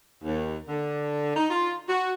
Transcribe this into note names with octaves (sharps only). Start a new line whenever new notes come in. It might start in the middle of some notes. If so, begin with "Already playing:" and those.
D#2
D3
D#4
F4
F#4